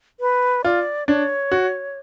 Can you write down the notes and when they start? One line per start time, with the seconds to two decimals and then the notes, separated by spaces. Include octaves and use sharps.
0.20 B4
0.64 F4 D5
1.07 D4 C#5
1.52 F#4